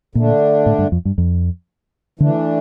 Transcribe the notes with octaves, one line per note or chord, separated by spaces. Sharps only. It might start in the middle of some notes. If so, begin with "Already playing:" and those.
A#2 D3 A3 D4
A2
G2
F2
G2
F2
D3 E3 A3 D4